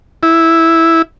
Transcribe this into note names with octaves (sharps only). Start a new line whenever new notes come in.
E4